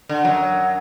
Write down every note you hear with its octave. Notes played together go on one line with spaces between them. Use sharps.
D3
F#2 F#3